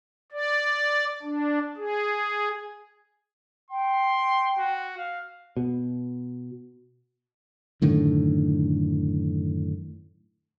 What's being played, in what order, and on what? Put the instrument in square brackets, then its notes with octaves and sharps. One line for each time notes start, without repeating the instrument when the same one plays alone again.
[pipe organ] D5
D4
G#4
[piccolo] G5 [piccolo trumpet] C6
[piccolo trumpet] F#4
F5
[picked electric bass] B2
[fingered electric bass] F#2 A2 D3 D#3